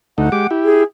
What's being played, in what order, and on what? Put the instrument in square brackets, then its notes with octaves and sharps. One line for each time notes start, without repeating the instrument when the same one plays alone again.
[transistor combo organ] D2 A3 D#4 [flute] F#5
[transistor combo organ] G#3 G4 D6
E4 G4
[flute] G#4